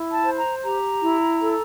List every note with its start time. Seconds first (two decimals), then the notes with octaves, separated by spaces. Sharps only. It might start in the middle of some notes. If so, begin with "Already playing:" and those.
Already playing: E4
0.12 A5
0.24 C5
0.37 A#5
0.63 G4 A#5
1.02 E4
1.40 A4